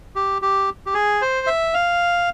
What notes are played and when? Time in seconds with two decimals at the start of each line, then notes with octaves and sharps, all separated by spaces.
0.15 G4
0.42 G4
0.86 G4
0.94 G#4
1.21 C5
1.47 E5
1.74 F5